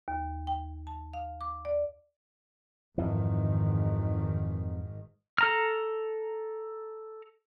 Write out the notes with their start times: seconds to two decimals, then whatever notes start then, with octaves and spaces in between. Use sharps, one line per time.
0.08 D#2
0.47 G5
0.87 A5
1.14 F5
1.41 D6
1.65 D5
2.98 G#1 F2 G#2 D#3 E3
5.38 A4 A#5 F6